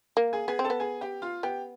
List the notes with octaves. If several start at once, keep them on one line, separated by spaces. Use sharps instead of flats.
A#3
G#4 G#5
B3 G#4 G#5
C4
A4 A5
B3
G#4 G#5
G4 G5
F4 F5
B3 G4 G5